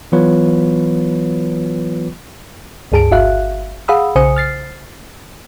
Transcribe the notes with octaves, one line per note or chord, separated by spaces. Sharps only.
E3 F#3 B3 F4 B4 C#5
C#2 G2 G#4 A5 D7
G1 F#4 E5 F5 F#6
G#4 F5 F#5 B5 D#6 E6
B1 C#3 C5 G#5 D#6 C#7
F6 A6 C7